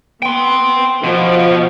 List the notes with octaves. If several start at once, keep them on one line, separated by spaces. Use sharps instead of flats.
B3 G5 C6
B2 F3